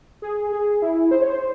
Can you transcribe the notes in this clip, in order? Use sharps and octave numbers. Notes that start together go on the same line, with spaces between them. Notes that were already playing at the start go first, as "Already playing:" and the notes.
G#4
G#4
E4
C5
C#5
C5